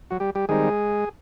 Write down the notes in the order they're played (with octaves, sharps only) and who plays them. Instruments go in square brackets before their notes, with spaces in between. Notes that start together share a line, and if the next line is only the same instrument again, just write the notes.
[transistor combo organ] F#3 F#4
G3 G4
G3 G4
D#3 G3 G#3 C4 D#4 G#4